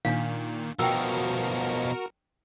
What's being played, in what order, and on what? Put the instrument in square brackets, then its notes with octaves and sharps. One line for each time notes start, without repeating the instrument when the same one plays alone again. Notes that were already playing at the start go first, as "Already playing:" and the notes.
[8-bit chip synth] A#2 D#3 [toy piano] D4 F5
[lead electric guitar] B2 F3 [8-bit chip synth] F#4 A#4 [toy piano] G5 E6